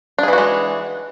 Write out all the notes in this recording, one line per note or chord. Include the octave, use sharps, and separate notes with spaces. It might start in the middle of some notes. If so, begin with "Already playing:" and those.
E3 G#3 D4 F#4 G#4